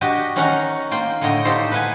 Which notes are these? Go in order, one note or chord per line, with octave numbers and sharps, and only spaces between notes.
D4 F#4 G4 D#5
D#3 C#4 D#4 A#4 F#5
A#3 F4 G5
A2 D3 C#5 D#5 G5
D#4 F4 G4 A4 C5
B4 F#5 G#5